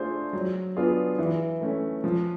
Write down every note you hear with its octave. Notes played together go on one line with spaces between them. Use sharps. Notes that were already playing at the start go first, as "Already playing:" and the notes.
Already playing: A3 D4 F4 G#4 C5
F#3
B3 D4 F4 G#4
E3
A3 C#4
F3